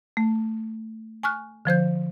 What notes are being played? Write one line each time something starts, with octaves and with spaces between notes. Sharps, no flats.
A3
G#5 C#6 F6 F#6
D3 F3 C5 G6